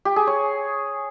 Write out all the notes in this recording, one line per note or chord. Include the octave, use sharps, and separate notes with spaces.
G4
G#4
C#5